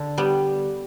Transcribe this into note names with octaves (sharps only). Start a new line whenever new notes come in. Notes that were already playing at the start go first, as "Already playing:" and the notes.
Already playing: D3
G3 B3